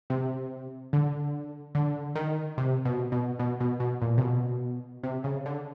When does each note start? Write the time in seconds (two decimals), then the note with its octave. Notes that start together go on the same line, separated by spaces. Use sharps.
0.10 C3
0.93 D3
1.75 D3
2.15 D#3
2.58 C3
2.85 B2
3.12 B2
3.39 B2
3.60 B2
3.80 B2
4.02 A#2
4.18 C3
4.21 B2
5.03 C3
5.24 C#3
5.46 D3